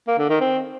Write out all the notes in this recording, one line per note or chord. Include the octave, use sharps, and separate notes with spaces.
A#3
D3
D#3
C4